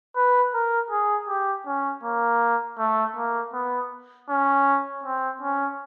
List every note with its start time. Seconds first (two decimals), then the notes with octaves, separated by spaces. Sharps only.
0.16 B4
0.54 A#4
0.91 G#4
1.28 G4
1.66 C#4
2.03 A#3
2.79 A3
3.17 A#3
3.53 B3
4.29 C#4
5.04 C4
5.42 C#4